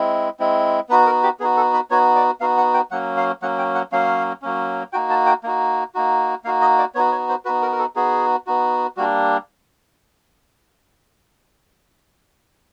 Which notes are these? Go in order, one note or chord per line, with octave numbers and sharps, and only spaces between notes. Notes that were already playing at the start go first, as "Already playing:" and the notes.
Already playing: G#3 C4 E4
G#3 C4 E4
B3 D#4 F#4 B4
A#4
G4
B3 D#4 F#4 G#4
A4
B4
B3 D#4 F#4 C#5
D5
B3 D#4 F#4 F5
F#5
G5
F#3 A#3 C#4 F#5
F5
F#3 A#3 C#4 F#5
G5
F#5
F#3 A#3 C#4 F5
F#3 A#3 C#4
A#3 D#4 F#4 G5
A5
G5
A#3 D#4 F#4
A#3 D#4 F#4
A#3 D#4 F#4 F5
D#5
D5
B3 D#4 F#4 C#5
C#5
C5
B3 D#4 F#4 B4
A#4
A#4
A4
B3 D#4 F#4 G#4
B3 D#4 F#4
G3 A#3 D4 F#4